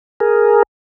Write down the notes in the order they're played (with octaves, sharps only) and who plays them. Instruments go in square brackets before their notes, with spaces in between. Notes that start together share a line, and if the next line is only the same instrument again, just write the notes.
[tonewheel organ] G#4 A#4